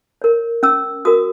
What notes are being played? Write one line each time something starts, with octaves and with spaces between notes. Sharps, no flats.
A#4 C#5
C#4 E6
F#4 A#4 D#6